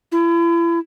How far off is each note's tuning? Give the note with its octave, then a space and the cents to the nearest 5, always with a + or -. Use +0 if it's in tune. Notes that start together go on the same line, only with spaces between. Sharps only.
E4 +35